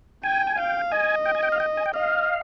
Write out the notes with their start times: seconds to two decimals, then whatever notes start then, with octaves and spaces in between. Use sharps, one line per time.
0.24 G5 G#5
0.47 G#5
0.58 F5 G5
0.92 D#5 G#5
1.26 G5
1.35 G#5
1.43 G5
1.52 F5
1.60 G5
1.77 G#5
1.86 G5
1.94 D#5 F5